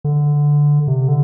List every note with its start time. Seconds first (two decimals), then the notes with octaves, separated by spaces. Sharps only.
0.04 D3
0.88 C3
1.08 D3